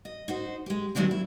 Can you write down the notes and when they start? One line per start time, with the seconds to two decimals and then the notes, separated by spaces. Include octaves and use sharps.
0.05 D#5
0.28 D#4 F#4 C5
0.66 G#3 G4
0.95 D#2 D#3 F#3 G#3 C4 D4
1.11 E4